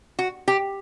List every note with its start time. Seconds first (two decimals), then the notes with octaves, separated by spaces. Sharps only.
0.19 F#4
0.48 G4